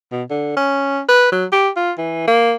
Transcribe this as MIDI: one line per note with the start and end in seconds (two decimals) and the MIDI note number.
0.12 0.23 47
0.30 0.53 50
0.57 1.01 61
1.09 1.28 71
1.32 1.45 54
1.53 1.69 67
1.76 1.92 65
1.98 2.23 52
2.28 2.54 58